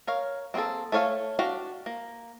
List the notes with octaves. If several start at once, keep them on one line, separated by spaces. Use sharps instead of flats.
A#4 C#5 F5
A#3 C4 D#4 G#4 A4
A3 A4 C#5 F5 G#5
D4 F#4 G4 F5 G5
A#3